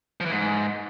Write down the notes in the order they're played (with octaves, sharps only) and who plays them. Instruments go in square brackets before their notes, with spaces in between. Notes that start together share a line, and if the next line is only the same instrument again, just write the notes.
[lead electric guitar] F3
E3
G#2